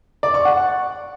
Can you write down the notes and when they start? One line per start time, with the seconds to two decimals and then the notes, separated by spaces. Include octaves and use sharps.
0.23 D5
0.34 C#6
0.45 F#5